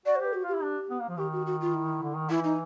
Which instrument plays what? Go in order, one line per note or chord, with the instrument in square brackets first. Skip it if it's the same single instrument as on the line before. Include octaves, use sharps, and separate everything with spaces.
[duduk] F#4 [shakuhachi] D5
[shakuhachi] C5
[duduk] G4 [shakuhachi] B4
[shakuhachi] F#4
[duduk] F4
[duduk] E4 [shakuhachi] G4
[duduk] D4
B3
A#3
F3
[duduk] D#3 [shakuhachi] G4
[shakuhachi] F#4
F#4
F4
E4
[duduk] D3
D#3
[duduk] E3 [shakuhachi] E4
[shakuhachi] D#4